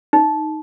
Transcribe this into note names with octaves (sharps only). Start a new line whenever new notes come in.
D#4